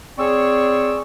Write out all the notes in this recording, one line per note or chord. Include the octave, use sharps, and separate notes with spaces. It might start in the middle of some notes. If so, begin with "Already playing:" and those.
C4 G#4 C#5 D5 C#6 E6